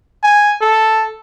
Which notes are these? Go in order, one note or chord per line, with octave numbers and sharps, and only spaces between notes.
G#5
A4